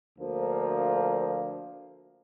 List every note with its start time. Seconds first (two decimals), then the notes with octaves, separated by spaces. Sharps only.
0.19 D2 F3 A#3